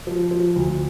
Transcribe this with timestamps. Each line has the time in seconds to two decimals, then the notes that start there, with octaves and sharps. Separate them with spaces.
0.07 F3
0.31 F3
0.56 D2